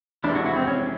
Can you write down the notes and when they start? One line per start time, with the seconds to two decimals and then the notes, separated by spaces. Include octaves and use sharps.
0.24 F2 C3 E3 G#3 D4 E4
0.35 E4 F#4
0.46 E4 F#4
0.56 C4
0.67 C#4